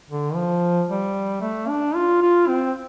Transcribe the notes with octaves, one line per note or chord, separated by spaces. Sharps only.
D3
F3
G3
A3
D4
F4
F4
C4